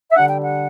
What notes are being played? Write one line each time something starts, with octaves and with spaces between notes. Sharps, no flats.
E5
D3 G3 D4 F#5
G5
F#5